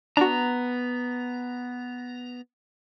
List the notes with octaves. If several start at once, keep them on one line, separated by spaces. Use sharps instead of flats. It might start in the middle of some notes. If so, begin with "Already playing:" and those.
B3 D4 F#4 A#5